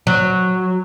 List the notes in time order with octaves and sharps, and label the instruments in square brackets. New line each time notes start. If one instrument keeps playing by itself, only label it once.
[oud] F#3